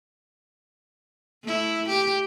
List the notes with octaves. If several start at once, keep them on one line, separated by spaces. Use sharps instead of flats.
A3 E4
G4